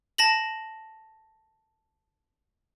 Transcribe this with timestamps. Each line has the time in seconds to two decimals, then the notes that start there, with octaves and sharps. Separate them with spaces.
0.18 A5 A#6 F#7